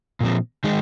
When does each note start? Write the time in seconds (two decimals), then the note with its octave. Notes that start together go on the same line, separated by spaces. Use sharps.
0.20 A#2 F3 C4
0.64 D#3 G#3 D#4